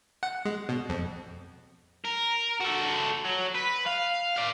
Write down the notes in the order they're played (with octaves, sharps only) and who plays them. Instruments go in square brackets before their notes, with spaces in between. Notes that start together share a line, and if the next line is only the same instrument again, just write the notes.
[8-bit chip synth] F#5
G#3
B2
F2
[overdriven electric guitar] A#4
F#4 A4
F#3
B4
F5
D5 F5